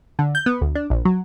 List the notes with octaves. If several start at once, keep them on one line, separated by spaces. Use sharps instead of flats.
D3
G6
B3
D2
D4
A#1
F#3